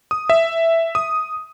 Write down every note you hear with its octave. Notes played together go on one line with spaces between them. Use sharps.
D#6
E5
D#6